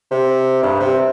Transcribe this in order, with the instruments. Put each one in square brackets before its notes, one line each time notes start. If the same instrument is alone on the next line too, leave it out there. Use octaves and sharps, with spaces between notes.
[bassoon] C3
G2
C3